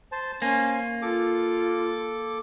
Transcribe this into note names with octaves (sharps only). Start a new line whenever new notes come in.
C5 A5
A#3 C#4 C5 G#5
F4 A4 D6